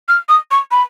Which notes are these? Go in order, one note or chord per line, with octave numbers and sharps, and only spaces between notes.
F6
D#6
C#6
B5